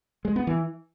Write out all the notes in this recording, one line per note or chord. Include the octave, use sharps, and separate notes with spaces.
G#3
B3
E3